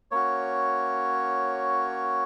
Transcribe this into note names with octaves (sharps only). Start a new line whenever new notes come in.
A#3 C#4 F#4 C#5